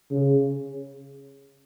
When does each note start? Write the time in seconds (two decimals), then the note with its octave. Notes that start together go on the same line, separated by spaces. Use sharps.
0.11 C#3